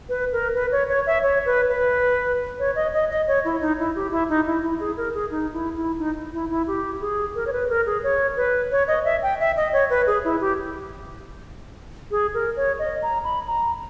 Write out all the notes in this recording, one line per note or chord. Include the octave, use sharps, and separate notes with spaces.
B4
A#4
B4
C#5
C#5
E5
C#5
B4
B4
C#5
D#5
D#5
D#5
C#5
E4
D#4
E4
G4
E4
D#4
E4
E4
G#4
A#4
G#4
D#4
E4
E4
D#4
E4
E4
G4
G#4
A#4
C#5
B4
A#4
G#4
C#5
B4
C#5
D#5
E5
G5
E5
D#5
C#5
B4
G#4
E4
G4
G#4
A#4
C#5
D#5
A#5
B5
A#5